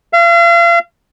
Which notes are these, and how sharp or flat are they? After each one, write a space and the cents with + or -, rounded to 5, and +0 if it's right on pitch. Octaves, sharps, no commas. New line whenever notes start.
F5 -40